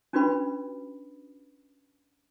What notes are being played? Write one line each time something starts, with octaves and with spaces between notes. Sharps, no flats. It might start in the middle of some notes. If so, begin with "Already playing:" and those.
C#4 D4 F4 F#4 B4 B5